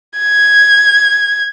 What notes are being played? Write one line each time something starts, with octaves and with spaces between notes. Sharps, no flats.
G#6